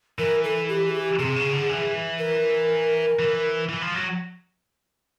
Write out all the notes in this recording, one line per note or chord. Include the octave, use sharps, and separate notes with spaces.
E3 A#4
A4
G4
G#4
G4
C3 G#4
C#3
D3
E3
A#4
E3
E3
F3
F#3